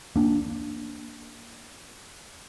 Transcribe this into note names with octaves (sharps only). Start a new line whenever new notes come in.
A#3 D4